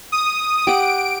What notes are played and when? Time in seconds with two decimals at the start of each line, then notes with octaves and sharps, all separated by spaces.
0.12 D#6
0.67 G4 F#5 D7